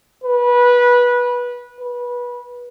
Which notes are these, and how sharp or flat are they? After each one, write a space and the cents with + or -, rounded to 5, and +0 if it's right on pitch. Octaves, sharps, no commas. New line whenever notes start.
B4 -20
B4 -20